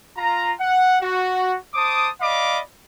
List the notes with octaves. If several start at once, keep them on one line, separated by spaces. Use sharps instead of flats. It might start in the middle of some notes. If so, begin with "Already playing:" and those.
F4 A#5
F#5
F#4
C5 A5 D6 D#6
D5 D#5 F5 B5 D6